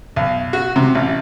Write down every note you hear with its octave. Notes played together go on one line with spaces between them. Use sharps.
B1
F#4
C3
A1